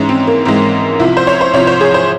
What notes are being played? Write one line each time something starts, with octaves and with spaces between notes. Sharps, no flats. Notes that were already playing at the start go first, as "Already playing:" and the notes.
Already playing: G#2 E3 G#3 C#4
C4
A#3
G#2 E3 G#3 C4
C2 C3 F3 E4
C5
C#5
C5
C2 C3 F3 C#5
C5
G#4
C5